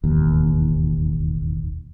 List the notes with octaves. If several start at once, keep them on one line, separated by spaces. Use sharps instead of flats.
E1 A1 D#2